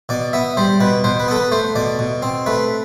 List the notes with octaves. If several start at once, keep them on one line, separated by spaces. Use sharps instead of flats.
B2 D5
B3 E5
G3 C5
B2 B4
B2 C5
B4
B3 A4
B4
A3 C5
B2 D5
B2
C4
A3 B4